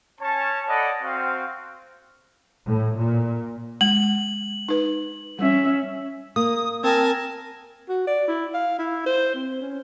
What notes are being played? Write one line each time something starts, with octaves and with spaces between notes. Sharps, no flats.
C#4 C#5 A5
A4 D5 D#5 F#5 A5 B5
C4 F#4 F5
A2
A#2
G#3 F#7
D#4 B4
G3 C#4 E5
A#3 D#6
C4 A#4 G#5 A5
F#4
D5
E4
F5
E4
C5
C4
C#4